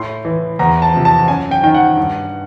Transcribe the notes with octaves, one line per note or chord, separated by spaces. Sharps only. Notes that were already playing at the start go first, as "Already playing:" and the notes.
Already playing: A2 C6
E3
E2 A#5
A5
C3 F3
A5
F#2 G#5
G5
D#3 G5
F#5
G2